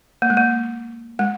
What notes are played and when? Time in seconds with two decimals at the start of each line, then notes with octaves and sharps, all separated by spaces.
0.22 A#3
0.30 G#3
0.37 A#3
1.19 G#3